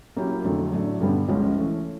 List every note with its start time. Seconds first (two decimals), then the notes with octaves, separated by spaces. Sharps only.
0.16 F#3 A#3 C#4 E4 G4
0.44 F2 D3 F#3 A3
0.72 A2 F#3 A3 D4
1.01 G2 D3 G3 B3
1.28 C#2 C#3 F3 G#3 C#4
1.56 E3 A3 C#4